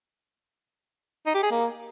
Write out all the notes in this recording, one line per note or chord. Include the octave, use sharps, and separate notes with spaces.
D#4
G4
G#4
A#3